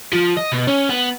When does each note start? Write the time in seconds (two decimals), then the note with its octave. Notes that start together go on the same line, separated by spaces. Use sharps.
0.13 F3
0.37 D#5
0.52 B2
0.67 C#4
0.90 B3